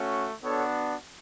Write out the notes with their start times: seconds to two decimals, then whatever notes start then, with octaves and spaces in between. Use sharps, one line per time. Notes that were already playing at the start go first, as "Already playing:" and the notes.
Already playing: A3 C#4 F#4
0.43 B3 D4 F#4 A4 C#5